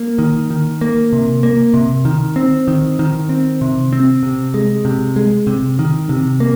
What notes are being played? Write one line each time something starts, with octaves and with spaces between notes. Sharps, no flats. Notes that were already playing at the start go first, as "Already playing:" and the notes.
Already playing: A#3
D#3
D#3
A#3
C3
A#3
C3
D#3
C4
D#3
D#3
C4
C3
C4
C3
G#3
C3
G#3
C3
D#3
C3
A#3